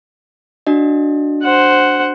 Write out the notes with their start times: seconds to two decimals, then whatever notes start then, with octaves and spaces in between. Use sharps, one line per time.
0.67 D4 F#4 D#5
1.43 C5 F#5